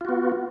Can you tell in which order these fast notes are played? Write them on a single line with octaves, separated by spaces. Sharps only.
F4 F#4 B3